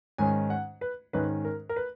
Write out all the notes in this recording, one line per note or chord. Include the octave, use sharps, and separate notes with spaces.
G#2 D#3 G#3 C#4 G#5
F#5
B4
G#2 D#3 G#3 C#4 B4
A#4
A#4
B4